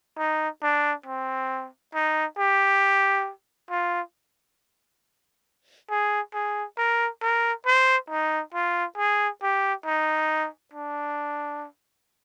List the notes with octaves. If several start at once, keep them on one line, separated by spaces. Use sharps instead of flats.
D#4
D4
C4
D#4
G4
F4
G#4
G#4
A#4
A#4
C5
D#4
F4
G#4
G4
D#4
D4